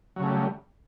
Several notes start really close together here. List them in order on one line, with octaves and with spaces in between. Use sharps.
F#3 C#3 A3 G3